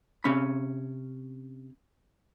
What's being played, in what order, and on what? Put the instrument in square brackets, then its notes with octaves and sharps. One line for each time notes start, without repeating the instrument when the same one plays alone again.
[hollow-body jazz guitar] C3 C#4 B5